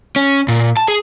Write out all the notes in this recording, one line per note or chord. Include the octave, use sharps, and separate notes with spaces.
C#4
A#2
A5
G#4